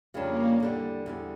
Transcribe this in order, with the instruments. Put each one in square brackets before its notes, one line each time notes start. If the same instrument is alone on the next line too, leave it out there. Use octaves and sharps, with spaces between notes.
[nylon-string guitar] F2 C#3 G3 D4 F4 [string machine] A#3
[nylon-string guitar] E2 D3 G3
E2 D3 G3